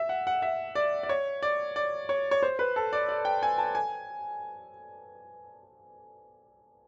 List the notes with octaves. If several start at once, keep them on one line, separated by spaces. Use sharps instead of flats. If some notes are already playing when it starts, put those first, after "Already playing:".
Already playing: E5
F#5
F#5
E5
D5
D5
C#5
D5
D5
C#5
C#5
C5
B4
A4
D5
D5
G5
G#5
A5
G#5